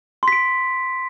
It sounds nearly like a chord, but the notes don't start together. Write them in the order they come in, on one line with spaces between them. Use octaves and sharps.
C6 B6 D7